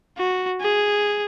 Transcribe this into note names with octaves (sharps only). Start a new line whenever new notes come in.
F#4
G#4